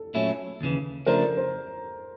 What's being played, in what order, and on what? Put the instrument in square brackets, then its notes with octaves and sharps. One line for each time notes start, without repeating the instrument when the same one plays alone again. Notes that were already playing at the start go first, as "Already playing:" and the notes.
Already playing: [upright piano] A4
[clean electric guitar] A#2 F#3 A3 C#4 E4
D#2 C#3 E3
[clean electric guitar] C#3 F3 A3 D4 [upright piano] A#4 C5
[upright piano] C5